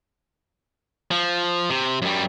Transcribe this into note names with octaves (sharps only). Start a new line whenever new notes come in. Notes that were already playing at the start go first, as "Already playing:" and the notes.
F3
C3
F#2 G3